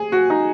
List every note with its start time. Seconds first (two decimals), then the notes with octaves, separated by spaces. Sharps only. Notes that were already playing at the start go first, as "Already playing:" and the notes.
Already playing: G#4
0.12 F#4
0.30 D#4